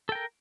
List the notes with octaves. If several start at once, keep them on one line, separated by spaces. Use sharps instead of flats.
A4 A#4 G5